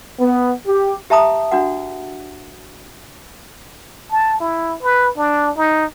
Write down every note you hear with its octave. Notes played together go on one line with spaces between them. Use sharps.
B3
G4
G4 E5 A5 A#5 D#6
D4 F#4 F#5
A5
E4
B4
D4
D#4